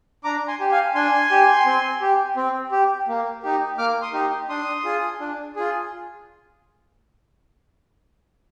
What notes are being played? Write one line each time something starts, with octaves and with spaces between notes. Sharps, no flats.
D4 A#5 D6
G#5 C6
G4
F5 G#5
D4 G#5 C6
G4
C4
G4
C4
G4
A#3
D#4 G4
A#3 D6 F6
C6 D#6
D#4 G4
D4 C6 D#6
F4 G#4
D4
F4 G#4